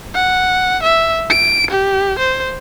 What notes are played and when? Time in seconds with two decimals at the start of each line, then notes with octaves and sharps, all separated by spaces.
0.14 F#5
0.83 E5
1.30 D7
1.70 G4
2.19 C5